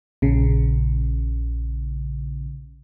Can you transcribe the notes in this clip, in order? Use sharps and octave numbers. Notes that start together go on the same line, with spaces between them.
A#1 C#3